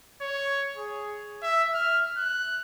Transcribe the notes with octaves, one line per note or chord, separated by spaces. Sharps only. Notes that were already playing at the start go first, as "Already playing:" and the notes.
C#5
G#4
E5
F6
F#6